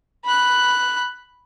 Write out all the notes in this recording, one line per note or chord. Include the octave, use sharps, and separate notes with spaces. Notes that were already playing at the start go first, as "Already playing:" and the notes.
B5 F#6